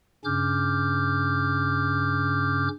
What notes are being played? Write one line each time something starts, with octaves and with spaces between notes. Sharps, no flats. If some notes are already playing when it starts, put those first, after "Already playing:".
G2 C#3 C#4 D6 F6 G6